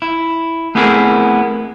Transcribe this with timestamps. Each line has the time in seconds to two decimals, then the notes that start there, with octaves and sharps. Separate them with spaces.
0.02 E4
0.75 A3 B3 C4 E4 G#4 A#4